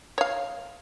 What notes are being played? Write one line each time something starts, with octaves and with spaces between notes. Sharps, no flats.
C#5 F5